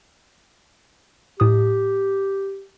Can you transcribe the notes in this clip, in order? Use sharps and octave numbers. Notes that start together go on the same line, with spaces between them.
A2 G4 D#6